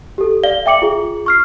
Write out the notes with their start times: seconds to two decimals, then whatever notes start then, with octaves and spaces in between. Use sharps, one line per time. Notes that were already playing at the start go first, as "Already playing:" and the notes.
0.18 G4 A4
0.43 D5 F5 G7
0.66 E5 G5 D6 C#7 F#7
0.82 F4 G#4
1.26 C#6 F6 C7